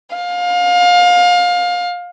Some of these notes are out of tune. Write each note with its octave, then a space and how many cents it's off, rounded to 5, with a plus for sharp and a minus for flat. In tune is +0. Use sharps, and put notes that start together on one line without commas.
F5 +25